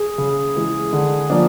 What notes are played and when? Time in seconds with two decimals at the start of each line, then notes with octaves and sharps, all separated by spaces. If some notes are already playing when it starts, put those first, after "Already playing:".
Already playing: G#4
0.18 C#3
0.56 E3 G#3
0.93 D3
1.30 F3 A#3 D4